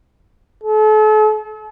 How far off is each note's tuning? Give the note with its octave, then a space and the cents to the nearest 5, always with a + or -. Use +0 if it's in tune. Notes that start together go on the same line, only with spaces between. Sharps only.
A4 -40